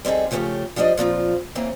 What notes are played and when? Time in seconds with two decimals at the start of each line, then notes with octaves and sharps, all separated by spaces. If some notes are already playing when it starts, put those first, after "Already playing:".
0.05 G3 C4 D#4 G#4 A4
0.31 C#3 F3 A3 B3 C#4 G4
0.76 F3 G3 D4 C5 D#5
0.97 A#2 F3 C4 F4
1.55 C#3 E3 A#3 C4